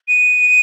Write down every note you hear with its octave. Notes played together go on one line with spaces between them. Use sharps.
D#7